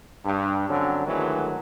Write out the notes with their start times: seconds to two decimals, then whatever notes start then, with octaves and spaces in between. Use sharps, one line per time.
0.25 G2
0.69 D3 F#3 C4 C#4
1.06 D2 D#3 E3 F#3 G#3